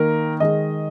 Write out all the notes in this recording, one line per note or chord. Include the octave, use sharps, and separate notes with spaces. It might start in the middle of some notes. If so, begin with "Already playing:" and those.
Already playing: D#3 A#3 A#4
D#3 G#3 D#5